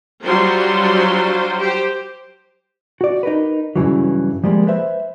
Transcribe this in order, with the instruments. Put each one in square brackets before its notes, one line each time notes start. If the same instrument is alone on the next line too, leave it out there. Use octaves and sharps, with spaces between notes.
[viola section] F#3 G3 D4 F4 C5 C6
G4 C5
[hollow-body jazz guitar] F#4 D5
D#4 A#4 B4
G2 C#3 E3 F#3
F3 G3 G#3 A#3
B4 C5 E5